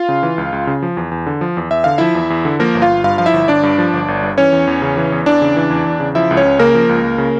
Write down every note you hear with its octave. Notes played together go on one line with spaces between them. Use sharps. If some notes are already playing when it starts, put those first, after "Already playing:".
Already playing: F4 F5
C#3
E3
C#2
C#2
C#3
F3
E2
E2
D3
F3
E2
E2 E5
D3 F5
F3 E4 E5
E2
E2
D3
F3 A#3 A#4
G1
F4 F5
G1
G2 F4 F5
F3 F5
E4 E5
G1
G1 D4 D5
G2
F3
G1
G1
G2
E3 C#4 C#5
E2
E2
C#3
E3
E2
E2 D4 D5
C#3
E3
E2
E2
C#3
F3 E4 E5
C#2
C#4 C#5
C#2
C#3 A#3 A#4
F3
C#2
C#2
C#3